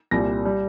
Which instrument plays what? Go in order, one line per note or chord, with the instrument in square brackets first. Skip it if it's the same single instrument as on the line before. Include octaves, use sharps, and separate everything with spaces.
[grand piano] C2 A#2 G3 A#6
G3